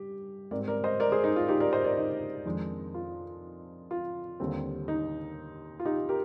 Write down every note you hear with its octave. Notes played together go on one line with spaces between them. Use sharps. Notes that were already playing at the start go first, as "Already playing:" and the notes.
Already playing: G2 G4
G#2 G3 C4 A#4 D5
A#4 D5
C5 D#5
A#4 D5
G#4 C5
D#4
F4
D#4 G4
A#4 D5
C5 D#5
A#4 D5
D#4
F2 D#3 G#3 D4
F4
F4
D#2 D3 G3 C4
D#4
F4
D#4 G4
G4 A#4